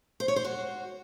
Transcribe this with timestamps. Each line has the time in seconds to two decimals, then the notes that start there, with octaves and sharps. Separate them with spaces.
0.20 C5
0.28 C#5
0.36 C5
0.44 F#4